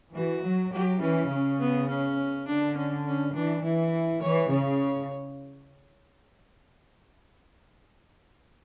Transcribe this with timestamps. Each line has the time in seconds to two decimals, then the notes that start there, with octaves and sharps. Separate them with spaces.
0.14 E3 F#4
0.44 F#3
0.73 F#3 G4
1.01 E3 C#4
1.31 C#3
1.60 B3
1.89 C#4
2.47 D3 D4
2.76 C#4
3.06 C#4
3.35 E3 D4
3.63 E3 E4
4.22 E3 C#5
4.51 C#3 C#5